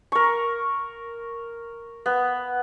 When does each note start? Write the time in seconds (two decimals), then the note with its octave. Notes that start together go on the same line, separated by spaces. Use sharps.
0.12 A#4 C#6
2.06 B3